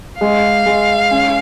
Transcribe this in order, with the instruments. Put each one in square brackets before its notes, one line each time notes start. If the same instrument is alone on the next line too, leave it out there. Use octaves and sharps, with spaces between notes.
[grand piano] G#3 [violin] F5
[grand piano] G#3
C#4